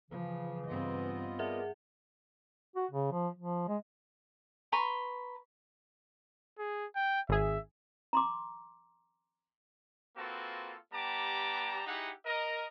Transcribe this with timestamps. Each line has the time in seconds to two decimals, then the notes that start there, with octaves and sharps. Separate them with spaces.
0.11 C#3 E3 F3
0.66 G2 B3 C4 F4 D#5
1.39 G#4 A#4 D5 E5 F#5
2.76 F#4
2.91 C#3
3.12 F3
3.39 F3
3.68 G#3
4.72 B4 A#5 C6 C#6
6.58 G#4
6.96 G5
7.29 G#1 G#4 E5
8.13 A#5 C6 D6
10.17 A#3 C4 F4 F#4 A4 B4
10.93 G3 B3 G4 A5 A#5 D6
11.87 D#4 E4 G4 G#4 F#5
12.25 A#4 D#5